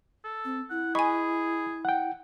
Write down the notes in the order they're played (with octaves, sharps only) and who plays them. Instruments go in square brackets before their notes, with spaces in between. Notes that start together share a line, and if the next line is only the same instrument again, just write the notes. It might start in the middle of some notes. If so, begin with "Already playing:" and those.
[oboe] A4
[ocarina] C4
[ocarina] E4 [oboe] F#5
[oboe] G#4 [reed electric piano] D#5 B5 [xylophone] G#5 C#6
[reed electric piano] F#5 G5